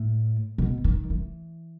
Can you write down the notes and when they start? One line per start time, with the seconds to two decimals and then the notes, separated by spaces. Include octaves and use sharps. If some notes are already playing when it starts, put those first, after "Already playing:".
Already playing: A2
0.58 B2
0.84 D#3
1.10 E3